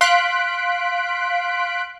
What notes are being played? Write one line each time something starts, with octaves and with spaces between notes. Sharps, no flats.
F5 C6 F#6 B6 D7